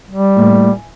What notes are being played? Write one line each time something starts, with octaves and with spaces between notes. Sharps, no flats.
G3
A2 A3 A#3
G#5